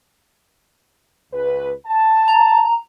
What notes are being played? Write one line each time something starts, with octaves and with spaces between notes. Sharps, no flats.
C#2 B4
A5
A#5